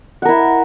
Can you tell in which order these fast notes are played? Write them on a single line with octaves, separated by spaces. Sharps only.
F#5 A#4 E4